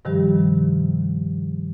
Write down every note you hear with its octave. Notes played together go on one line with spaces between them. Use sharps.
G2 C3 D#3 F3 G3 G4